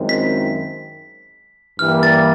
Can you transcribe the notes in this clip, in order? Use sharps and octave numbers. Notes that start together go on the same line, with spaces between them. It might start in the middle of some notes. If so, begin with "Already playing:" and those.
Already playing: F#2 D#3 G#3 C4 E4
B6
G2 E3 G3 A#3 F6
A6